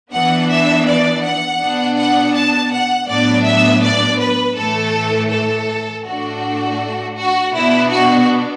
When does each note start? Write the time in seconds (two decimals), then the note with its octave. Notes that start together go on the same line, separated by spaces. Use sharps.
0.12 E3 B3 D4 F#5
0.50 E5
0.87 D5
1.23 F#5
1.61 B2 B3 D4
1.97 F#5
2.35 A5
2.72 F#5
3.08 A2 F#3 B3 D4 D5
3.45 E5
3.83 D5
4.19 B4
4.56 A2 E3 A3 A4
5.31 A4
6.05 A2 A3 D4 F#4
7.16 F#4
7.53 B2 B3 D4 E4
7.90 F#4